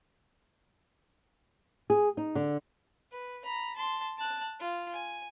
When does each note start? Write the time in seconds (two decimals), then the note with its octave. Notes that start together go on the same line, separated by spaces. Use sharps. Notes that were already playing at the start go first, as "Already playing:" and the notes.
1.90 G#4
2.17 D#4
2.35 D3
3.12 B4
3.44 A#5 B5
3.76 A5 C6
4.18 A5 F#6
4.60 F4
4.93 G#5